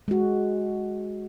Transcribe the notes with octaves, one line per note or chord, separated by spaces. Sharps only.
G#3 F#4